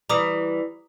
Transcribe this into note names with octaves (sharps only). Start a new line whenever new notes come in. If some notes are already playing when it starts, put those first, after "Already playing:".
E3 G3 A#5 D6 D#6